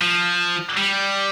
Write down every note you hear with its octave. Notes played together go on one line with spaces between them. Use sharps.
F3
G3